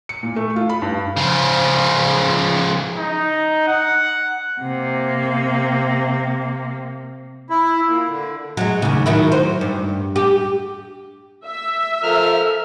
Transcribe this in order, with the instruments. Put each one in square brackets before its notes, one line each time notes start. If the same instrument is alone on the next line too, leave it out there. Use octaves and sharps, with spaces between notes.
[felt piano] C#7
A#2
A3
F4
B5
G2
[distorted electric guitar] C#3 F3
[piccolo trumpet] D#4
F#5
[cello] C3 A#3
[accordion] E4
A#2
D3
[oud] F#3 G#3
D#2 C#3
D#3 F#3 E4
C5
G2
G4
[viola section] E5
[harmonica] F3 A#4 F6 [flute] A4